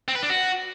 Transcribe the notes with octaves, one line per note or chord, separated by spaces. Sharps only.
C4
B4
D4
F#4